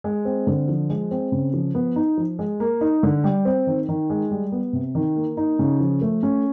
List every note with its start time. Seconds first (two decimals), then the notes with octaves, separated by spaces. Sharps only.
0.04 G#3
0.25 C4
0.47 D3
0.68 F3
0.90 G#3
1.11 C4
1.32 C#3
1.54 F3
1.75 B3
1.96 D#4
2.17 F3
2.39 G#3
2.60 A#3
2.81 D#4
3.03 D3
3.24 G3
3.45 C4
3.67 D#3
3.89 D#3
4.10 G#3
4.31 G3
4.52 B3
4.73 C3
4.95 D#3
5.16 A#3
5.37 D#4
5.59 C#3
5.80 F3
6.01 A3
6.23 C#4